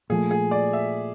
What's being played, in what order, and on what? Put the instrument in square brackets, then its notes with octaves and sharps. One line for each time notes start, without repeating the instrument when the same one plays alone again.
[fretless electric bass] A#2 F3 A3 [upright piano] G#4
[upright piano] G#4
D5
E5